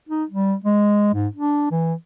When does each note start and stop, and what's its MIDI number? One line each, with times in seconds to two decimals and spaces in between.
0.09 0.24 63
0.30 0.54 55
0.64 1.09 56
1.14 1.27 44
1.35 1.68 62
1.71 1.93 52